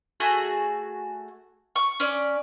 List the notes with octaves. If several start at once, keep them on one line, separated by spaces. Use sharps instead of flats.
A3 F#4 G#4
C#6
C#4 D5